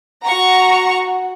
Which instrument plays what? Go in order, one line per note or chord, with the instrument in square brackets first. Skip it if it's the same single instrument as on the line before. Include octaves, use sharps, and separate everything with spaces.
[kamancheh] F#4 F#5 [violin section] A#5 C#6